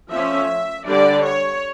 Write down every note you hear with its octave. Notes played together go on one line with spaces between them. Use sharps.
F3 A3 C#4 E5
D3 G3 D4 D5
C#5